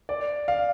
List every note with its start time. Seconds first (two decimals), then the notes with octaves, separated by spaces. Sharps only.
0.09 D5
0.48 F5